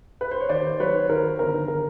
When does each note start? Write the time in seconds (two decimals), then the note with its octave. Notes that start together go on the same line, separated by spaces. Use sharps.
0.21 B4
0.31 C5
0.40 C#5
0.49 D#2 C5 D5
0.80 F#3 B4 C#5
1.09 D#2 A#4 C5
1.39 G1 A#4
1.68 D#3 A#4